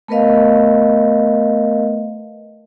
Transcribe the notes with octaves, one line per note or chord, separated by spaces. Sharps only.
A3 B3 A#4 B4 D#5 F5